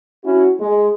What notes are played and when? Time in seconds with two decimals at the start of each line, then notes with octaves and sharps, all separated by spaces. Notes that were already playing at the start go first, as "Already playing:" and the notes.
0.25 C#4 E4 F#4
0.60 G#3